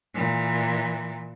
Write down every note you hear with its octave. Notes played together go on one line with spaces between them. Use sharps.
A#2 E3